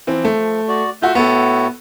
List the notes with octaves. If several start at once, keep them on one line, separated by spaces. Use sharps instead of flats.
E3 F3 C4
A3
F#4 D5
A3 F4 F#4 E5 G6
A2 B3 E4 F#4 A4